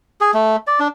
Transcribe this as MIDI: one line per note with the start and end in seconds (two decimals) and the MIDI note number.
0.21 0.31 68
0.34 0.56 57
0.67 0.80 74
0.80 0.88 62